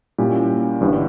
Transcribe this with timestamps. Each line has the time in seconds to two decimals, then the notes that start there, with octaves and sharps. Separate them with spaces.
0.18 A#2 G3 C#4 E4 G4
0.80 G1 G2 E3